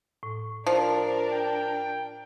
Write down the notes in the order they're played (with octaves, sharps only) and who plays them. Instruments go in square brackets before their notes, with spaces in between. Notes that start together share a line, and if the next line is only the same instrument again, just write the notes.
[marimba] A2
[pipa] F3 [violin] D4 A#4 [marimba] C5 D5
[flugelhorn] G5